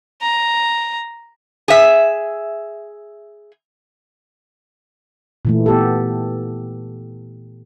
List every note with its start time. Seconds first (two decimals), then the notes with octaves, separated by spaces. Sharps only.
0.22 A#5
1.68 G#4 E5
5.45 A#2 E3 A3
5.66 B3 G4 A4